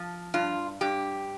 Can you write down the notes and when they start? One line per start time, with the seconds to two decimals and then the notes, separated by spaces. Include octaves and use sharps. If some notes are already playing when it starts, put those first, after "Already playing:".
Already playing: F3
0.34 G2 F4
0.81 G2 G4